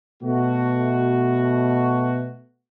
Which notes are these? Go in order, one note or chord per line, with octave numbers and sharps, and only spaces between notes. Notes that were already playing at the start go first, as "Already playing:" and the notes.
B2 A3 F#4